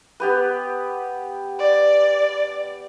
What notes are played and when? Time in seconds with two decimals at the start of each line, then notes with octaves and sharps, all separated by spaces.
0.20 B3 G4 B4
1.59 D5